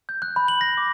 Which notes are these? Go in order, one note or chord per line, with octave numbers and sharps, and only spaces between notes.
G6
F#6
B5
F#7
A#6
D6